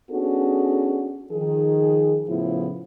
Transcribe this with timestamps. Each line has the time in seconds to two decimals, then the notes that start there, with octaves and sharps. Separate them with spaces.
0.11 B3 C#4 D4 F#4 G#4 A4
1.32 D#3 F3 G#4
2.29 A2 C#3 F3 B3 E4 F4